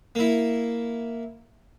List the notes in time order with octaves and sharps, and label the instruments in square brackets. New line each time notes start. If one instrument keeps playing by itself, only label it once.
[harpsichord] A#3 E4